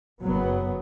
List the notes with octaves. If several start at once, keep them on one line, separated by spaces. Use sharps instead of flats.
F#1 F#3 B3